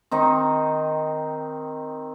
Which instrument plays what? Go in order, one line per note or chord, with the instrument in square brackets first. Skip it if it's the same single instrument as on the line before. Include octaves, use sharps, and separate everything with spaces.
[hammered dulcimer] D#3 C4 D#4